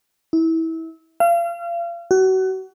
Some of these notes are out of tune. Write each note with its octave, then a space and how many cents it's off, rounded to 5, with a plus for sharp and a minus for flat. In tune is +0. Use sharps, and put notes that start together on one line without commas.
E4 -25
F5 -35
F#4 +30